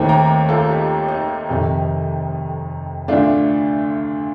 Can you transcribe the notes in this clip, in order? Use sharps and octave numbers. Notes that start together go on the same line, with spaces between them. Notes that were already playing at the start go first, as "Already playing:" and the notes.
Already playing: D#2 D#3 A3 C4
G5 A#5
F4 A4
D#4 G4
D#4
F1 F2 C3 D#3 D#4
D2 D3 A3 D4 F4